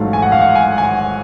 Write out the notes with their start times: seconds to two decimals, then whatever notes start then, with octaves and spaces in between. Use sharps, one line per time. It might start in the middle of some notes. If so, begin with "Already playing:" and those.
Already playing: A1 G#2 F#3 A3 F5
0.13 G#5
0.22 F#5
0.32 F5
0.41 F#5
0.55 G#5
0.78 G#5
0.84 F#5